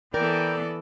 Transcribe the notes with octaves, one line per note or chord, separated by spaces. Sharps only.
E3 B3 A4 A#4 D5 G5